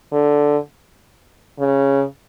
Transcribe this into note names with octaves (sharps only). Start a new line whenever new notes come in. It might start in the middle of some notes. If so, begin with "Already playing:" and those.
D3
C#3